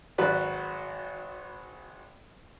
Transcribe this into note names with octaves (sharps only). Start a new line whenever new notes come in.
G#1 F#3 F#4 B4 D5